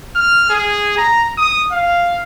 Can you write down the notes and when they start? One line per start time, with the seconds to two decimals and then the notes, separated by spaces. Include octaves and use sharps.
0.15 F6
0.50 G#4
0.97 A#5
1.38 D#6
1.72 F5